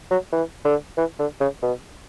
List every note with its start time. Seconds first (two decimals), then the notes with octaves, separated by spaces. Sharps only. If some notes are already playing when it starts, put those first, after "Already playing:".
0.11 F#3
0.33 E3
0.65 D3
0.98 E3
1.19 D3
1.41 C#3
1.62 B2